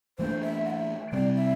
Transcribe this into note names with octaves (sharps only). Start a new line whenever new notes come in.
E3 A3 D4 C5
E5
F#5
E5
C3 G3 C4 D5
E5